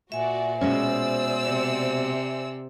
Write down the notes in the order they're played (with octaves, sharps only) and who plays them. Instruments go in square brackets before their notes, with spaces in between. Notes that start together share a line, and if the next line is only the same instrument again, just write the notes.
[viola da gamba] A#2 [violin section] F#4 D5 [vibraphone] E5 G#5
[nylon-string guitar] B2 G#3 C#4 [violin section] C5 D5 E6
[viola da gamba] C3